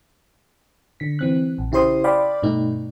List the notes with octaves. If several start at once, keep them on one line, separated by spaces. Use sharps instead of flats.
D3 B6
E3 C4 F#6
A#1
C#3 E4 G4 C5 C6 D#6
D5 F5 G5 B5 D6
G2 B2 A3 D#4